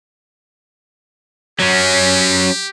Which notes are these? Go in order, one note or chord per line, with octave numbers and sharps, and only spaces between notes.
F#3 C#4 G4